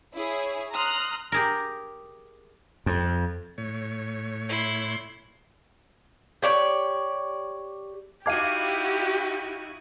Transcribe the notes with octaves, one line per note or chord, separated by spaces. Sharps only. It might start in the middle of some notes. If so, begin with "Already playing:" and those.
E4 G#4 C#5
A#5 C6 D#6 F6 F#6
G4 G#4 A#4
F2
A2 C#5
E4 C6
G4 C#5 D5
D#4 E4 F#4 G4 F5 D6 G#6 D#7